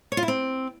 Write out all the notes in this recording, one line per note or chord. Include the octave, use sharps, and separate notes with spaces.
C#5
F4
E4
C4